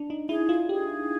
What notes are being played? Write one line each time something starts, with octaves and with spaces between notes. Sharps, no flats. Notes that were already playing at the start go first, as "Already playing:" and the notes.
Already playing: D4
D#4
E4 G#4
F4
G4 G#4